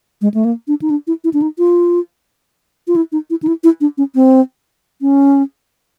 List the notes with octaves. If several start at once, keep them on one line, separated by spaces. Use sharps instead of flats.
G#3
A3
A#3
D4
D#4
D4
E4
E4
D4
D#4
F4
F4
E4
D#4
E4
D#4
E4
E4
D4
C#4
C4
C#4